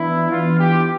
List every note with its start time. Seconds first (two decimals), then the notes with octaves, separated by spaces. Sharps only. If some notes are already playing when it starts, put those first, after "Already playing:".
Already playing: E3 B3 D4 E4
0.29 E3 B3 D4 F4
0.57 G4